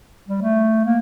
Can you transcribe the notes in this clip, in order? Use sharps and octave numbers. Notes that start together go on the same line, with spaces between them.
G3
A3
A#3